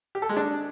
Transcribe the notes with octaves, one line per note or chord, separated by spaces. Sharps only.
G4
A4
G#3
D4